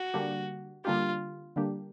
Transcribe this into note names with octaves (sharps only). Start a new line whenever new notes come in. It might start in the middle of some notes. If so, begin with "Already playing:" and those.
Already playing: F#4
D3 G3 A#3 D4 G4
D3 G3 A#3 D4 F4 G4
D3 G3 A#3 D4 G4